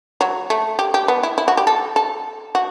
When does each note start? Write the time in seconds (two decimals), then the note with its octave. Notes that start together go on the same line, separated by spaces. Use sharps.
0.21 F#3
0.50 A3
0.79 G4
0.94 G4
1.08 B3
1.23 E4
1.38 E4
1.48 F#4
1.57 G4
1.67 A4
1.96 A4
2.55 F#4